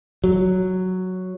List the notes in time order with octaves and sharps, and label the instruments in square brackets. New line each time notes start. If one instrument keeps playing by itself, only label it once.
[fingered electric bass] F#3